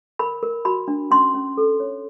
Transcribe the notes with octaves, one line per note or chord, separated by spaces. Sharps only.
A#4 B5
A#4
F#4 B5
D4
C#4 C6
C#4
A4
C#5